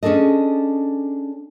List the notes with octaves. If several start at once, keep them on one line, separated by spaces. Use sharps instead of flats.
C#4 D4 G#4 A4 D#5